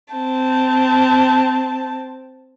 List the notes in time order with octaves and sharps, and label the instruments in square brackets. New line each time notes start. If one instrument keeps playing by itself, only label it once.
[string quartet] C4 A5